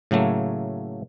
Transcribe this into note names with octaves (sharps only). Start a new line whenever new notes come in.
A2 C#3 F#3 A3 A#3